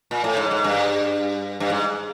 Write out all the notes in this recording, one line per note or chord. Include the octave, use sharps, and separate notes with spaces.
A#2
A2
G#2
G#2
G2
G2
G#2